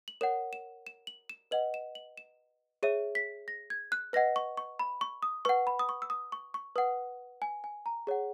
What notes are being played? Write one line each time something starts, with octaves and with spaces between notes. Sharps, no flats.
F#7
A#4 C#5 F#5 E7
E7
E7
F#7
E7
B4 D#5 F#5 F#7
E7
F#7
E7
G#4 C#5 E5 D#7
B6
A#6
G#6
F#6
B4 D#5 F#5 A#6
C#6
C#6
B5
C#6
D#6
B4 F#5 C#6
B5
D#6
C#6
E6
D#6
C#6
C#6
B4 F#5 D#6
G#5
G#5
A#5
G#4 C#5 F#5